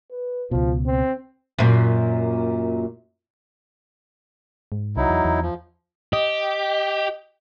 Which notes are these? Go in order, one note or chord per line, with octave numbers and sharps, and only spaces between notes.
B4
C#2 B2 F3
C4
F#2 A#2
G#2
C2 F#3 D#4 E4
E2
E2
F3
G4 D#5